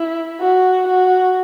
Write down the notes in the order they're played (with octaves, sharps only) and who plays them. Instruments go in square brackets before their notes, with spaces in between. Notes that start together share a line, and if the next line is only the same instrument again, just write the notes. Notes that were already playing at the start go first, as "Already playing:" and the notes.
Already playing: [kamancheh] E4
F#4
F#4